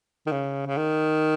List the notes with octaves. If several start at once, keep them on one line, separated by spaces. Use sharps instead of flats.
D#3
C#3
C#3
D#3